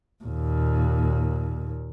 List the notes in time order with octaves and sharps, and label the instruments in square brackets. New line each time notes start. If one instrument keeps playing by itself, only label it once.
[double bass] D#2 A#2